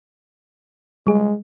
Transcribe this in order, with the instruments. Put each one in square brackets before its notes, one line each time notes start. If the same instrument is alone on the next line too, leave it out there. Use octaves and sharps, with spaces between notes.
[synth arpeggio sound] G3 G#4 [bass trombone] G#3